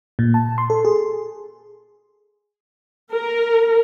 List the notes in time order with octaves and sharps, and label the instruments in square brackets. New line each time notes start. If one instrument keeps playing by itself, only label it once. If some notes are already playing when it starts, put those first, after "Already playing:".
[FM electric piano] A#2
A5
C6
A4
G#4
[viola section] A#4